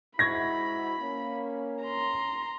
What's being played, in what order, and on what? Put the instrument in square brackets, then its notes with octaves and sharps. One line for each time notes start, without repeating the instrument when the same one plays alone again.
[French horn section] G#2 E4 F#4 [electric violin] B5 [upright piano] C#6 G#6 A#6
[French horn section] A#3 C#4
[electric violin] A#5 C6